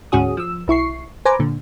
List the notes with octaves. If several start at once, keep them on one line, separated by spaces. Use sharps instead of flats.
D2 G#2 C#4 F#4 G#4 D#6
F3 E6
B1 E4 C#6 C7
B4 C5 G#5 A#5 D6
A#2 D3